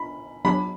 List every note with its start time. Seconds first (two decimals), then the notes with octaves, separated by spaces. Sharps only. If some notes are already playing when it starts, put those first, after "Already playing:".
Already playing: B5
0.45 F#3 B3 D4 G4 C#5 B5